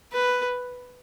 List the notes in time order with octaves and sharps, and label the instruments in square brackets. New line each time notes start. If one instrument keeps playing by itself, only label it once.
[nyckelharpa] B4